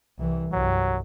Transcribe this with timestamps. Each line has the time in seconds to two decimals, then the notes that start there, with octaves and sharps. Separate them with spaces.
0.19 C2 E3
0.52 C2 G2 F#3